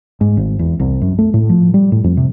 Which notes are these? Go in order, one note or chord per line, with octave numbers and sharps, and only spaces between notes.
G#2
G#1
E2
C2
F#2
A3
A2
F3
G3
A2
F2
C3